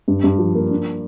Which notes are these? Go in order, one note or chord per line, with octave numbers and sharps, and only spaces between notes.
G2
G2
F3
A#3
D4